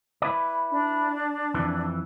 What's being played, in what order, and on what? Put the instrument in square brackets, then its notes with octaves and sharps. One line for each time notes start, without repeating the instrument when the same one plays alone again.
[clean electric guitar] E4 B4 D5
[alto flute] D4
[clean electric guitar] F2 E3